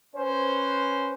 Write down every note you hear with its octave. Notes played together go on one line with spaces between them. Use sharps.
C#4 B4 C5